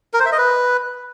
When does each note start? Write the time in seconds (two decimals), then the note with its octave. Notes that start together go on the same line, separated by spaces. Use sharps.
0.14 A#4
0.20 C5
0.26 E5
0.32 D#5
0.38 B4